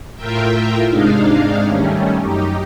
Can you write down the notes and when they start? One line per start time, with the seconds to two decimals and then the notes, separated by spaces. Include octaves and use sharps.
0.15 A2 F4 A#4 E5 G5
0.88 G#2 C3 G#3 D4 D#4 F5
1.64 D#3 G3 A3 C#4
2.20 F#2 D#4 G4